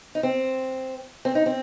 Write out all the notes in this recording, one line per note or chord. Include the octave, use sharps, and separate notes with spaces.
D#4
C4
C4
D#4
C4